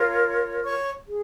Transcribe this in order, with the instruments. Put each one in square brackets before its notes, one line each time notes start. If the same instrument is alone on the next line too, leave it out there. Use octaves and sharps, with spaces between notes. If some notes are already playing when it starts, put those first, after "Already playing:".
Already playing: [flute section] F4 A#4 C#5
C#5 C#6
G#4